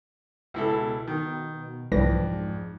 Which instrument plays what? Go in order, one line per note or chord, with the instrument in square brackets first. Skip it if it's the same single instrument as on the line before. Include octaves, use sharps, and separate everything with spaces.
[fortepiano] C#2 E4 A4 [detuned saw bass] B2
[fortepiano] D#3
[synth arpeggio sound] C2 E3 A#6 [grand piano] F2 [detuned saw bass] G#2 [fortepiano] D4